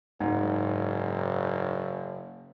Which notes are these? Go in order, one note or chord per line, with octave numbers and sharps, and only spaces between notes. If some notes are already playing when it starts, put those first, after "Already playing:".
F#1 G#2